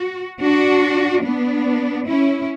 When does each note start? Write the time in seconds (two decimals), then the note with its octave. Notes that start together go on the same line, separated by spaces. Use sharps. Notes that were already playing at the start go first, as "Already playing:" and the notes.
Already playing: F#4
0.41 D4 F#4
1.24 B3 D4
2.07 C#4 E4